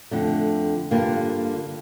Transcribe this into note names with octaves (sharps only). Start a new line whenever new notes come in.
F2 D3 A3
G2 D3 G3 A#3 F4